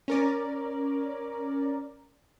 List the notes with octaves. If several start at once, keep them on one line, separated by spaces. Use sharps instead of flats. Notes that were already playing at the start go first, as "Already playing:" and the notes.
C#4 A#4 D5